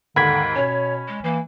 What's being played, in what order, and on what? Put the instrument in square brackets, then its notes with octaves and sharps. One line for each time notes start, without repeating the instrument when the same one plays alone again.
[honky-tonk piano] D#2 G#2 [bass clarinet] D3 [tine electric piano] B5 G#6 B6
[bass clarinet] B2 [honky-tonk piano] C#4 [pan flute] C#5
[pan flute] G#3
[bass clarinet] E3 [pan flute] A#3